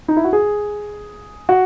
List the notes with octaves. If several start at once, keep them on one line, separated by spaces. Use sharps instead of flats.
D#4
E4
F#4
G#4
F#4